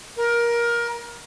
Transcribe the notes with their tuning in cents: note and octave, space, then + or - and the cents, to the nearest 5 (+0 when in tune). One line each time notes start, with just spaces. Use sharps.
A#4 +20